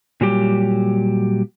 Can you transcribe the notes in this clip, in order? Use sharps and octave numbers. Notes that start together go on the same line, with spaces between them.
A#2 F#3 G3 G4